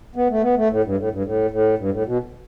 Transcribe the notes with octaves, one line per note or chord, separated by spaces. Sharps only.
B3
A3
B3
A3
A2
G2
A2
G2
A2
A2
G2
A2
B2